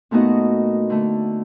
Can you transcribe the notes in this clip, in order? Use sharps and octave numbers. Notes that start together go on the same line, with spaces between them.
A#2 A3 B3 D#4 F#4 D#5
D3 A3